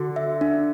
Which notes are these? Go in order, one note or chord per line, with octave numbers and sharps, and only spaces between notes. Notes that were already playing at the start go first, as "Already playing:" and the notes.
Already playing: D3 F#4
E5
D4